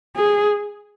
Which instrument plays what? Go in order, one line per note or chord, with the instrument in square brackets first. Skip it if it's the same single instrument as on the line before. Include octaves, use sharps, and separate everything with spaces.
[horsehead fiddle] G#4